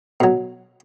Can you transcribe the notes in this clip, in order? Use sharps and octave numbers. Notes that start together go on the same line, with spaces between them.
B2 F#3